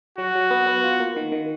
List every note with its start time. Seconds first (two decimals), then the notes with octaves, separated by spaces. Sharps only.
0.18 F#3 F#4
0.35 F#3
0.51 B3
0.67 B3
0.84 F4
1.00 A#3
1.16 D#3
1.32 D#3